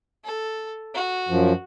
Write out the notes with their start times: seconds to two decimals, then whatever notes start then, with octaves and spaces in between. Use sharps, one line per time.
0.24 A4
0.95 F#4
1.29 F#2 F3